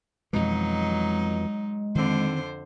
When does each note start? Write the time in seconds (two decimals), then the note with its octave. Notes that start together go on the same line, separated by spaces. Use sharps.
0.33 F2 B2 E3 F#3 G#3 D#4
1.95 F2 D3 D#3 C4 C5